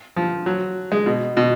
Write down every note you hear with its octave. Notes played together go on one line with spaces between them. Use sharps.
F3
F#3
G#3
B2
B2